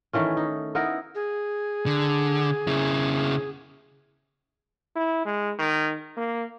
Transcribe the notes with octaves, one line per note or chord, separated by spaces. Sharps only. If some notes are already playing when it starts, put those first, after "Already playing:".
D#3 E3 A3 C#4
D#4
B3 D#4 E4 A#4
G#4
D3
C#3 E4
E4
G#3
D#3
A#3